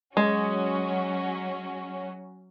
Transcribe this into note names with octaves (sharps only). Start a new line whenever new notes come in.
F#3 G#3 C#4 F#4